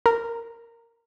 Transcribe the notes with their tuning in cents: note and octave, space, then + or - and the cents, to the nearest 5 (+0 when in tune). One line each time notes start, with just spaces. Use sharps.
A#4 -10